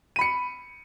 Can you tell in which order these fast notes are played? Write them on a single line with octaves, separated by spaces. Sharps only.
D#7 B5 C#7